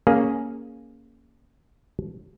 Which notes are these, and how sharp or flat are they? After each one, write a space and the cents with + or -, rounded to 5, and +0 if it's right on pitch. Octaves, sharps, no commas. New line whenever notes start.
A#3 +0 C#4 +5 G#4 +0